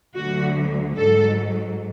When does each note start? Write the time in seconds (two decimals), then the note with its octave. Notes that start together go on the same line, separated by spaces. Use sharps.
0.15 D2 D3 F#3 F#4
0.97 G#2 F#3 A4